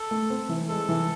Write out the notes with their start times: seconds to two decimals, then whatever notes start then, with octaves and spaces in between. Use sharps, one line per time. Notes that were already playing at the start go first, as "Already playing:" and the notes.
Already playing: A4
0.11 A3
0.30 C4
0.49 E3
0.69 G#3 A4
0.89 E3